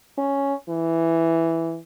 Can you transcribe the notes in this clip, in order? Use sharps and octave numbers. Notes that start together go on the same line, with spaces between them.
C#4
E3